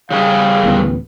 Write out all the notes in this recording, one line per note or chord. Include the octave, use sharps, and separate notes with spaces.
C#3 G3 G#4 F5
D1 A1 B3